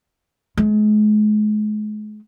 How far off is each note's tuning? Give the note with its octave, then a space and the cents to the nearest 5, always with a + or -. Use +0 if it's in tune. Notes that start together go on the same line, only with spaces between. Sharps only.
G#3 +35